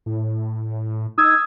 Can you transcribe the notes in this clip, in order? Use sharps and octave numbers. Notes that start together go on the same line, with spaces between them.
A2
D#4 D#6 E6 G#6